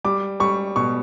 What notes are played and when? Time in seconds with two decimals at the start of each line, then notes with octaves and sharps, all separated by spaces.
0.04 G3 D6
0.40 G3 C#6
0.76 B2 C#6